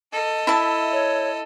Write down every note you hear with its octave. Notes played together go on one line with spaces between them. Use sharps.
A4 D#5
E4 E5 A5
C#5